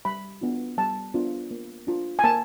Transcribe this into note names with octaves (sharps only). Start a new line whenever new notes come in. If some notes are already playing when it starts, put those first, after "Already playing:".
G3 B5
B3 D4 F4
G3 A5
B3 D4 F4
A#3
D4 F4
G#5
A#3 A5